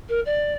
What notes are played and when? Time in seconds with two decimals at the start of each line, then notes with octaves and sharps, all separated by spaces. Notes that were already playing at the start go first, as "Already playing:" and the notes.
0.08 A#4
0.25 D5